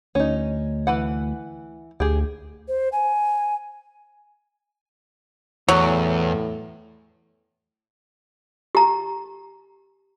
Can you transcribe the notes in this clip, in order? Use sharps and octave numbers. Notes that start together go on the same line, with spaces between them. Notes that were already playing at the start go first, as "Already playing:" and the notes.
D2 C#4 D#4
E3 B4 F#5
D2 G4 G#4
C5
G#5
E2 A2 F#3
G4 A#5